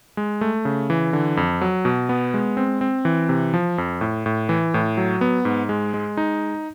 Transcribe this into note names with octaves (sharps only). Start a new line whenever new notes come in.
G#3
A3
C#3
E3
D3
F2
F#3
B2
B3
G#3
C4
C4
E3
C3
F3
F2
A2
A2
E3
A2
F#3
B3
G#2
G#3
G#3
D#4